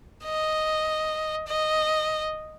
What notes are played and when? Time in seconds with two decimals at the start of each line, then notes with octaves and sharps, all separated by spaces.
0.25 D#5
1.48 D#5